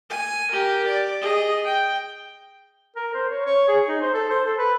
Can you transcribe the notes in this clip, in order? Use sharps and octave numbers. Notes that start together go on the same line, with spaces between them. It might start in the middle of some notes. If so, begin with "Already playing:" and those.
G#5
G4 A#4
D5
G#4 D#5
G5
A#4
C5
C#5
C#5
G#4
D#4
C5
A4
C5
A4
B4